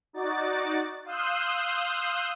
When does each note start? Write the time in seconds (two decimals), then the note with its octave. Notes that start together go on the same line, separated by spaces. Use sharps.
0.13 D#4 F#4 D5 A6
1.05 F5 C6 D#6 E6 F#6 G6